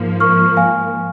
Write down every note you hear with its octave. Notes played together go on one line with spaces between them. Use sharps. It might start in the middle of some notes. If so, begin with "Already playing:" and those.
Already playing: G#2 F3 A#3
C#6 F6
F5 G#5